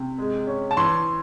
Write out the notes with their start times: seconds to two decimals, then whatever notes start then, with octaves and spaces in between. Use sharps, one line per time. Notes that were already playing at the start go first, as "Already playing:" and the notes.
Already playing: C3
0.18 G#3
0.47 C#4
0.71 A5
0.77 E3 C6